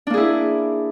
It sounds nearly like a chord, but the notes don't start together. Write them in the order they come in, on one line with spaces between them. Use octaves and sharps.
D4 A#3 G#4 E4